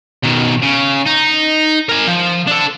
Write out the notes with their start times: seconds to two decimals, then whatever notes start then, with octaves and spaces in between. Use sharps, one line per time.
0.23 B2 D#3
0.62 C#3
1.07 D#4
1.89 A#4 G#5
2.08 F3
2.48 D4 A4